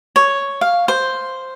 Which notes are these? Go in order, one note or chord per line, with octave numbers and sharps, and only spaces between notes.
C#5
F5
C5